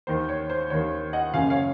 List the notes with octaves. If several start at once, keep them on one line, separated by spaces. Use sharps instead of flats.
D#2 D#3 C5
C#5
C5
D#2 D#3 C#5
D#5 F#5
F#1 F#2 C#3 F5 G#5
C#5 F5